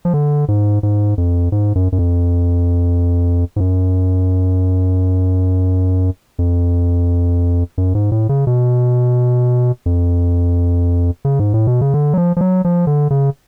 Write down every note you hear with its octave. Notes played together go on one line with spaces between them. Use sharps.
F3
D3
G#2
G#2
F2
G#2
F#2
F#2
F2
G#2
F#2
F2
F#2
G#2
A2
C#3
B2
F2
C#3
G#2
A2
B2
C#3
D3
F#3
F3
F3
F#3
F3
D3
C#3